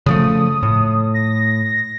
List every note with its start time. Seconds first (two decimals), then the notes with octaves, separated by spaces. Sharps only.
0.06 C#3 F3 A3 D#6
0.63 A2
1.14 A#6